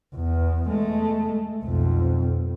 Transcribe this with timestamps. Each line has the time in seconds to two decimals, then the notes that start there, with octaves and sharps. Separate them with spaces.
0.15 E2
0.68 G#3 A3
1.64 B1 F2